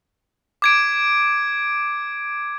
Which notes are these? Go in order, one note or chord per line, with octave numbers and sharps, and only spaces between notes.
D6 G#6 D7